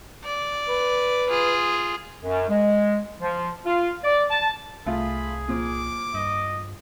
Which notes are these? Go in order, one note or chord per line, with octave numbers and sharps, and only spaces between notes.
D5
B4
F4 G#4
F#2
G#3
F3
F4
D5
A5
C2 A3 F4 G#4 B5
A#2 F3 D6
G2 D#5